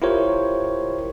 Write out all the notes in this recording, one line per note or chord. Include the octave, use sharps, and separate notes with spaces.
E4 F4 G4 A#4 C5 C#5